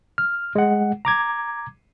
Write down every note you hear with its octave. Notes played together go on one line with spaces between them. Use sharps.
F6
G#3 F#5
A#5 D6 G#6